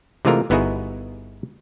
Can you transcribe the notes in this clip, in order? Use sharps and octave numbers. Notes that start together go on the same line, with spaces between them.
C3 E3 G#3 A3 F4 A#4
G1 B3 D#4 E4 F#4 G#4